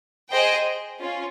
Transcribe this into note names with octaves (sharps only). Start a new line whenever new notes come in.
G#4 C5 D#5 G5
C#4 F4